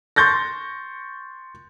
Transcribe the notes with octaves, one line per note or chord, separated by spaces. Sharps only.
C6 C#6 G6 A6 A#6